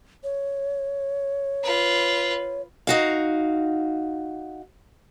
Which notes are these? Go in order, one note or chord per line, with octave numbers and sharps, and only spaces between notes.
C#5
F4 B4
D#4 F#4 F5